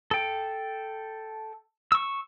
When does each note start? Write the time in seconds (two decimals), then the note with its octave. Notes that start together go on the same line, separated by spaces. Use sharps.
0.11 A4 G5
1.92 C#6 E6